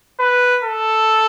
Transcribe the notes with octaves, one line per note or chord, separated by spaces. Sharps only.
B4
A4